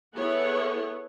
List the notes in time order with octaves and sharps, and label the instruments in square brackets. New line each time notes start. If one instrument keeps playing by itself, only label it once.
[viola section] B3 E4 G#4 A4 C#5 F#5